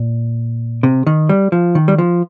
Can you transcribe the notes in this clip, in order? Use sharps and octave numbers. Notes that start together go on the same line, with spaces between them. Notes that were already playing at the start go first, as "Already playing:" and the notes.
Already playing: A#2
C3
D#3
G3
F3
D#3
G3
F3